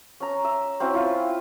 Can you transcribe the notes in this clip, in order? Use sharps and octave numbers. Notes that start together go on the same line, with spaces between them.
C#4 A#5
E5
C4 C#4 E4 F#4
E4 F4